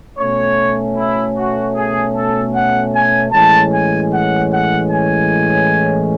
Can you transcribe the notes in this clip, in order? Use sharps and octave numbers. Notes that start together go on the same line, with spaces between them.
B2 A3 C#4 C#5
E4
F#4
G#4
A4
F#5
G#5
A2 E3 G#3 C#4 A5
G#5
F#5
F#5
G#5